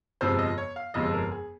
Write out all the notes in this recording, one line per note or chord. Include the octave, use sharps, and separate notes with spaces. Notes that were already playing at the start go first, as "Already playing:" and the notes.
G1 F2 C3 F3 G#3 C5
D#5
C#5
F5
G1 F2 C3 F3 G#3 D#5
A#4
G#4